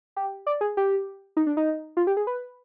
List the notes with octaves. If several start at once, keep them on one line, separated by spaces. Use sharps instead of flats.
G4
D5
G#4
G4
D#4
D4
D#4
F4
G4
G#4
B4